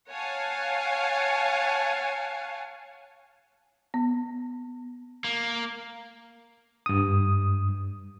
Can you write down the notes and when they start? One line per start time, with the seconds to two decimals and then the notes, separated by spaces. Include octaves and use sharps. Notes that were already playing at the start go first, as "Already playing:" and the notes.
0.10 C#5 F5 F#5 G#5 A5
3.94 B3
5.24 A#3
6.86 G2 D#6